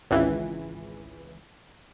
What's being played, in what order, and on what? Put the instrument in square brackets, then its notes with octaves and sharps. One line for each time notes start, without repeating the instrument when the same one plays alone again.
[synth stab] G#1 C#2 E3